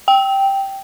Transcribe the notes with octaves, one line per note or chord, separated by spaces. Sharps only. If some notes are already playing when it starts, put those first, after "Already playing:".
G5